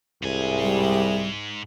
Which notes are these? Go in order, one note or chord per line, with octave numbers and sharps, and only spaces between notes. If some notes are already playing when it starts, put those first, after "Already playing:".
C2 G#2 G#4 E5 G#5
G3